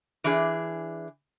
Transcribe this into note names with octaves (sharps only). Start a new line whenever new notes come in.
E3 D4 G#4